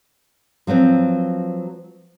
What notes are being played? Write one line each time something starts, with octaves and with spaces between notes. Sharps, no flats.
F3 F#3 B3 C4